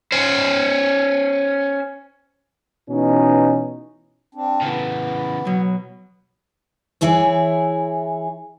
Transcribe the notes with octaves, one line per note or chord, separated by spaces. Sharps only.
C#4 C5
B2 E3 C#4 D#4
C4 D4
C#3 E3 B3
B2 F#3
E3 E4 G#4 C#5